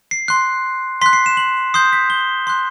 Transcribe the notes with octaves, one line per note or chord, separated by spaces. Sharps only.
C7
C6 F#6 C7
C6 F#6 B6
C7
E7
F#7
C6 D#6 G6 C7
B6
G7
C6 F#6